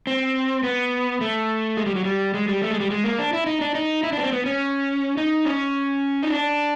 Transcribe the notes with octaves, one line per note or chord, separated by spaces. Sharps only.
C4
B3
A3
G#3
G3
F#3
G3
G#3
G3
A3
G#3
G3
G#3
A#3
D4
E4
D#4
D4
D#4
E4
D4
B3
C4
B3
C#4
D#4
C#4
D#4
D4